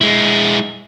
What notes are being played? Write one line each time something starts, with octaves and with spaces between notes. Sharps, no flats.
G#3 E4